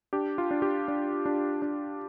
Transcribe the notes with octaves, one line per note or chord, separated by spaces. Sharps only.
D4 G4
F4
D4
G4
D4
D4
D4